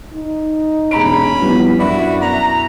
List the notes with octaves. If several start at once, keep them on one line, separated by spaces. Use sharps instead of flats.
D#4
E1 C#4 A#5 B5 D7
E3 F3 G3 B3
F#2 D4 E4 F#4 D5 B5
B2 E4 A#5